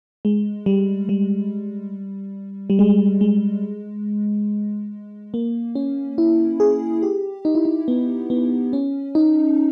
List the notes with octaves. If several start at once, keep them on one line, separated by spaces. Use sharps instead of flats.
G#3
G3
G3
G3
G#3
G#3
A#3
C#4
E4
G#4
G4
D#4
E4
D#4
B3
B3
C#4
D#4